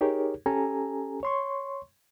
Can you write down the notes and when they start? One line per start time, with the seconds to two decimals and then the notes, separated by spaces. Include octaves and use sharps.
0.01 D#4 G4 G#4 A#4 C#5
0.46 C#4 G4 A4 G#5 A#5
1.23 C#5 C6 C#6